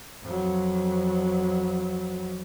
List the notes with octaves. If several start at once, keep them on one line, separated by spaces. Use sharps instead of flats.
F2 F#3